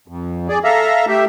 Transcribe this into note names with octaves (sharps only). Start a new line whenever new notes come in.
F2
G#4 D5
A4 E5 F5 A#5
A3 G4 E5